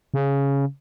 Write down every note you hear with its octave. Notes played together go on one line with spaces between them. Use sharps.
C#3